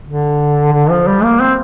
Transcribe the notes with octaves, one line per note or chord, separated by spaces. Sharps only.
D3
D3
F3
G3
A#3
C4